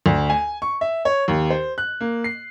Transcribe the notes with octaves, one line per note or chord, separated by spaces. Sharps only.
D2
G#5
C#6
E5
C#5
D#2
C5
F#6
A#3
C7